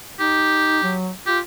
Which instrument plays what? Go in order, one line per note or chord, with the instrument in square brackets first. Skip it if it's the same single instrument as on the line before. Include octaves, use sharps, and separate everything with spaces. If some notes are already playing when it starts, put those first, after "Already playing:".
[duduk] D#4 [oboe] G4
[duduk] F#3
[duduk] F4 [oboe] G4